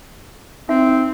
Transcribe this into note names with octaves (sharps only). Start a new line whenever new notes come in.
C4 D#4 E5